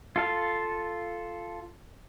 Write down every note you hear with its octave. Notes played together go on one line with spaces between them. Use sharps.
F4 A4 F5